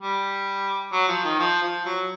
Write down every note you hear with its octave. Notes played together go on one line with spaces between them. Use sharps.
G3
F#3
F3
D#3
F3
F3
F#3